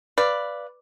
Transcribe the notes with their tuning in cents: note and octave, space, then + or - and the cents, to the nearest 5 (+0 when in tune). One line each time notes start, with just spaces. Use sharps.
B4 +0 D5 +0 F5 -15